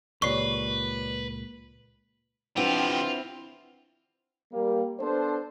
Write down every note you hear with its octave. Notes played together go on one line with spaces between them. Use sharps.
C#2 A#2 G4 B4 C#5 D5 C#6 C7
F3 C4 D4 E4 F4 G4 B4 F#5
G3 A#3
B3 D4 A4 C5